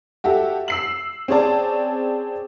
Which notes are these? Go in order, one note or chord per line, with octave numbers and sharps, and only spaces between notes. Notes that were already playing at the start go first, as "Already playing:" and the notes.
F#4 G4 A4 E5
E6 C7 F#7
C4 C#4 G#4 C#5 D5 A5